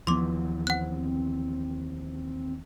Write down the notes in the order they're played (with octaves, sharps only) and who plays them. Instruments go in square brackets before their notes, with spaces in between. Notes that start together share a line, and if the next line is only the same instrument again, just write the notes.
[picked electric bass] D#2 E3 [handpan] F3 B3 [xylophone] C6 D6
[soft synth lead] C4 [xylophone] F#5 F#6